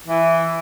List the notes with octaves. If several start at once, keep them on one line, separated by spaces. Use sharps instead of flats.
E3